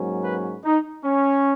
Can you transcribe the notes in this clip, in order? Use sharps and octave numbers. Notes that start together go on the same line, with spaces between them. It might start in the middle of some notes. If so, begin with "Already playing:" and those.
Already playing: G#2 F#3 A#3 C#4
B4
D#4
C#4